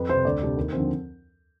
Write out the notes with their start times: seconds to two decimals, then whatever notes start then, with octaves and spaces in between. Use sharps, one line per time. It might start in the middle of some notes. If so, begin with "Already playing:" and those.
Already playing: F2 B4
0.09 C3 G3 C5
0.25 D2 D5
0.41 C3 G3 D4
0.57 D#2
0.72 D3 F3 C4